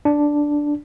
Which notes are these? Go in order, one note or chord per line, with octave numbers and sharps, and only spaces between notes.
D4